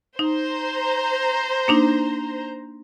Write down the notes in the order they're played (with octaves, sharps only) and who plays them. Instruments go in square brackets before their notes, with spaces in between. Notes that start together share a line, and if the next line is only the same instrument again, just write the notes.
[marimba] D#4 [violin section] C5 A#5
[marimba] A#3 D4 D#4